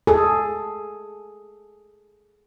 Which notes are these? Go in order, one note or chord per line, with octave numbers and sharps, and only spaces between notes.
G#4 A4